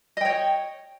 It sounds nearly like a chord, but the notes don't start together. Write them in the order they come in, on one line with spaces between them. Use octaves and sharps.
D#5 G5 C#5